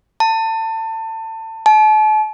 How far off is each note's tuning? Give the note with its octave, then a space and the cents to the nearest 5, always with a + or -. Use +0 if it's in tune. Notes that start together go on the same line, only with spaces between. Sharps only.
A5 +25
A5 -40